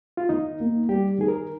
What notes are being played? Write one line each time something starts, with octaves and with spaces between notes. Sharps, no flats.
F4
D#3 D#4
A#3
G3 G4
D#3 G#4
A#4